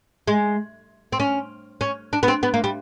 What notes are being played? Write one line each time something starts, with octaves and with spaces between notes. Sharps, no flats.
G#3
C4
C#4
C#4
D4
B3
C4
B3
A#3
G3